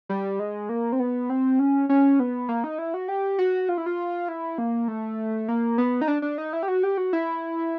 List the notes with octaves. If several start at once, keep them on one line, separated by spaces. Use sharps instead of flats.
G3
G#3
A#3
C4
B3
C4
C#4
C#4
B3
A#3
D#4
E4
F#4
G4
F#4
F4
E4
F4
E4
A#3
A3
A#3
B3
D#4
D4
D4
D#4
E4
G4
F#4
G4
F#4
E4